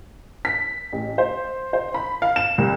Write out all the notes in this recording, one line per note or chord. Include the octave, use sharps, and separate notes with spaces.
B6
A1
C5
C5
B5
F5
E7
C2